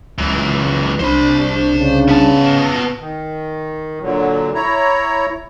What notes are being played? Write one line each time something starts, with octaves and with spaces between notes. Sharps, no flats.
C#2 F#2 E3
C2 D4 C5 B5
C#3
B3 A5
D#3
A#2 D3 F#3
E4 C#5 A#5